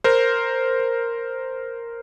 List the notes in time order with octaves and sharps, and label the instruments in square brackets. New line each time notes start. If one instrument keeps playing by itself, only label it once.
[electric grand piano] A#4 C5